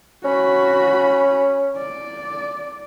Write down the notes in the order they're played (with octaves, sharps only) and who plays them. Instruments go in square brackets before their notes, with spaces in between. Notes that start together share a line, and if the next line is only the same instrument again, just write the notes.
[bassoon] C#4 [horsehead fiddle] F#4 B5
[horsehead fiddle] D5